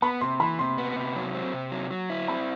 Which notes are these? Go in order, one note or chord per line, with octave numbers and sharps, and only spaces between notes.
B3 B5
C3 C6
E3 B5
C3 C6
B3
C3
F#3
C4
C3
F#3
F#3
E4
C4 B5